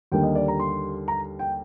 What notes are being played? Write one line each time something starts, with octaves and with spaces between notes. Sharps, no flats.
D#2 D3 G3 A#3 G5
D#5
D5
A#5
C6
A#5
G5